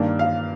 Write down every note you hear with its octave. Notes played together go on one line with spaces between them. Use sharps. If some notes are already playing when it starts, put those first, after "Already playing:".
Already playing: G2 D#3 A#3 D4
F5